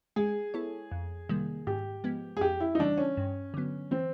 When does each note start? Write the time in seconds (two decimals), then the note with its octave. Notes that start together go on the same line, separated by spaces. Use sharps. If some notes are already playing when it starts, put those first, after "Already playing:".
0.16 G#3 G#4
0.54 B3 E4 A4 C#5
0.92 F2
1.29 C3 D#3 G3 A#3
1.67 G#2 G4
2.04 F3 G#3 B3
2.37 G#4
2.41 F2 G4
2.60 E4
2.75 D#4
2.79 C#3 E3 G3 D4
2.98 C#4
3.17 G2
3.54 D3 F#3 B3
3.91 E3 C4